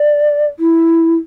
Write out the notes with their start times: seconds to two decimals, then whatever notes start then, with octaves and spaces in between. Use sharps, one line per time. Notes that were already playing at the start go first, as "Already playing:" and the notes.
Already playing: D5
0.59 E4